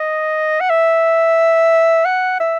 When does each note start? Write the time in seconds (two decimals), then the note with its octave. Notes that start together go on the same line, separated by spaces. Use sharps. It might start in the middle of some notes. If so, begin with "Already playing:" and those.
Already playing: D#5
0.60 F#5
0.70 E5
2.05 F#5
2.40 E5